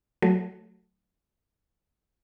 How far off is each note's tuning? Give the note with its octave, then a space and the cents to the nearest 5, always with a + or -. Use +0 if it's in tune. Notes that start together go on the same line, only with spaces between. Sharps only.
F#3 +0 A3 +0